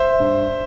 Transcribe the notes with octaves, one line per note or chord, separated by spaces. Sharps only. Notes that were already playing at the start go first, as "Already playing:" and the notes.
Already playing: C5 E5
G2